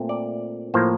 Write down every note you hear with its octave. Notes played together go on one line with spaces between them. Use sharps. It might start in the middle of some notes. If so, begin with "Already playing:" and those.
Already playing: A#2 A3 C4
D5
A2 F3 A#3 C5